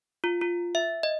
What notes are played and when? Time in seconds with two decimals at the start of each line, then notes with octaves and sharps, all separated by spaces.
0.24 F4
0.41 F4
0.75 E5
1.03 D#5